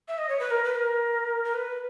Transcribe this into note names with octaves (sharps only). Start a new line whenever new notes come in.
E5
D#5
C#5
B4
A#4
B4
A#4
A#4
B4